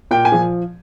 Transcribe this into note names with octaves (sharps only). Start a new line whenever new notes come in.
A#2 G5
G#5
F3